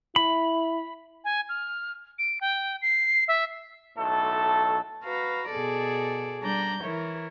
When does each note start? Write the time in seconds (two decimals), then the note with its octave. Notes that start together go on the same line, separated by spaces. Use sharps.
0.16 E4 B5
1.24 G#5
1.49 F6
2.19 D7
2.41 G5
2.82 C7
3.28 E5
3.97 B1 A2 A3 A4
5.03 F#4 B4 F5 A#5
5.48 B2 G#4 A4 D5
6.42 G3 D4 D5 A#5 G6
6.84 E3 E4 A#4 C#5